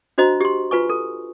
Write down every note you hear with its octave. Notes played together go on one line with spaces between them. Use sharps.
D4 F#4 C5 D#5 A#5
G4 C6
F4 B4 G#5 C#6
A4